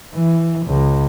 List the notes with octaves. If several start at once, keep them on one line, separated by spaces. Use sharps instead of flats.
E3
C#2